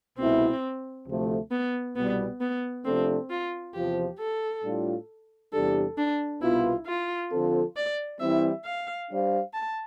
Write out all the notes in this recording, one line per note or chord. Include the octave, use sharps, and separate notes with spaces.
C2 B2 A3 C4 E4
D2 C3 F3 A3
B3
C2 B2 G3 B3
B3
C3 F3 A3 C4 D4 A4
F4
E2 C3 F3 G4
A4
A2 G3 D4 F4
E2 C3 G3 D4 G4 A4
D4
C2 B2 B3 E4 F4
F4
D3 F3 C4 F4 A4
D5
E3 G3 C4 E4 E5
F5
G3 D4 G4 C5 F5
A5